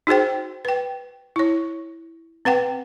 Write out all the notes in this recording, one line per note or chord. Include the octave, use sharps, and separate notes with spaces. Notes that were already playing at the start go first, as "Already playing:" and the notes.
D#4 F#4 G#4 C5 G5
B4 G5
E4 C#5
C4 B4 F#5 G5